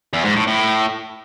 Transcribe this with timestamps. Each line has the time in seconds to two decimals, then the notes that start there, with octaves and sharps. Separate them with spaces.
0.13 E2
0.25 G#2
0.36 A2
0.47 A2